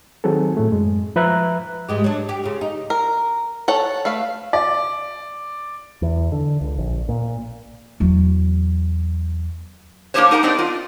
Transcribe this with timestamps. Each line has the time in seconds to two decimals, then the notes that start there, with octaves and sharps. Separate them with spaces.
0.24 D#3 F#3 C4 G#4 A4
0.57 A2 A3
0.71 F#2 G#3
1.16 F3 B4 E5 A#5 F#6
1.88 G#2 G#3 G4
2.04 F#3 D4
2.29 G4
2.44 C#3 F4
2.61 D#4
2.90 A#4
3.68 A4 C#5 F#5 A5
4.05 A3 B4 F5
4.53 D5
6.02 E2
6.32 D3
6.61 C#2
6.78 A#1
7.09 A#2
8.00 E2 F#3
10.14 A#3 B3 D4 G4 C5 C#5
10.31 D#4 A#4 F#5 A5 A#5
10.43 B3 C4 D4 D#4 D5
10.59 F4